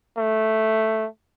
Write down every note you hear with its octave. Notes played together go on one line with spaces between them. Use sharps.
A3